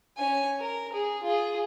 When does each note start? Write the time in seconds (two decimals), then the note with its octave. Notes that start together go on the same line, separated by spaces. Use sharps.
0.17 C#4 G#5
0.60 A#4
0.93 G#4
1.24 F4 G#4